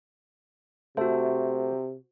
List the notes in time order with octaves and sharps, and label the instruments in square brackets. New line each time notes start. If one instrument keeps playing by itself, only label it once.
[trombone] C3 [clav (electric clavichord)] A3 [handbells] F#4 C5